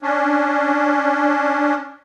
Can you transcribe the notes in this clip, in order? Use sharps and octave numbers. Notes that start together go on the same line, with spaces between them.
C#4 D4